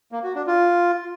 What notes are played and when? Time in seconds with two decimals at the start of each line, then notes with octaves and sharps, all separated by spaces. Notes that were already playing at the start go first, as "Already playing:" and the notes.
0.12 A#3
0.24 F#4
0.35 D4
0.47 F4